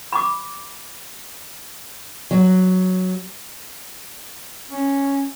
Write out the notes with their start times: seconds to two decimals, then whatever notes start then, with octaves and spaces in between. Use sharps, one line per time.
0.12 B5 D6
2.31 F#3
4.71 C#4